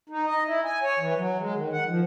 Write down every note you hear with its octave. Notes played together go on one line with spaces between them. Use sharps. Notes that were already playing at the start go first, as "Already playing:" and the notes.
D#4
D#5
E4
G#5
C#5
E3
F#3
G#3
D#3
F#5
F3